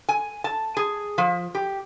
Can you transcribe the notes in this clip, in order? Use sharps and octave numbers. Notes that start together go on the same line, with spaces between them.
G#5
A5
G#4
F3
G4